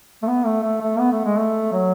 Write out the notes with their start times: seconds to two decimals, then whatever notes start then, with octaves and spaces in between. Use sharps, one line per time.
0.22 A3
0.27 B3
0.45 A3
0.63 A3
0.82 A3
0.99 B3
1.12 A3
1.25 G#3
1.38 A3
1.72 F#3